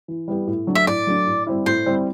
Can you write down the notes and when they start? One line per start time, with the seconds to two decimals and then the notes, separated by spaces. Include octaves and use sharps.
0.08 E3
0.28 G3 B3 E4 G4
0.47 A2
0.67 F#3 A3 D4
0.75 E5
0.87 A2 D5
1.07 F#3 A3 D4
1.27 A2
1.47 G3 C4 E4
1.66 A2 C5
1.86 G3 C4 E4